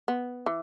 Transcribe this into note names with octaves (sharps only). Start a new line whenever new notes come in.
B3
E3